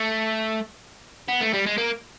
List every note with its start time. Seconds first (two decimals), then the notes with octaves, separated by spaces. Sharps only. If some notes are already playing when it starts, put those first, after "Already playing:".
Already playing: A3
1.28 B3
1.41 A3
1.53 G3
1.66 G#3
1.78 A#3